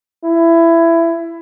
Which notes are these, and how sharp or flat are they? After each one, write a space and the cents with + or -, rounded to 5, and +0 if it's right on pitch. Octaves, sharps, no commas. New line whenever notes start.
E4 +15